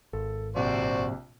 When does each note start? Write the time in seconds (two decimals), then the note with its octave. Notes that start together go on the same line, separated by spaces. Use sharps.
0.13 G#1 A4
0.56 A#1 C3 F#4 C5 D5